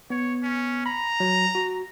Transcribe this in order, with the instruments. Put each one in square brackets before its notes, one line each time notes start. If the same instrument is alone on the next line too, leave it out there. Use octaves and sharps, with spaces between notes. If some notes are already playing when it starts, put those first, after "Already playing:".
[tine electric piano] B3 [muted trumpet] C#5
[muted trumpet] C#4
[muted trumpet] A#5 [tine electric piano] B5
[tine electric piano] F#3
F#4